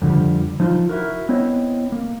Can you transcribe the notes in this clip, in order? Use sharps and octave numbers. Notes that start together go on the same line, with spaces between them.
F2 D3 F3 G3
F3 D#4 F4 A5 C6
E4 F#4 A#4
B3 C4 E4 C#5 D#5
A#3